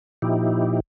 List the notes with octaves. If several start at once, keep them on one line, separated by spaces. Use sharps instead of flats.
A#2 F3 D#4 E4 G4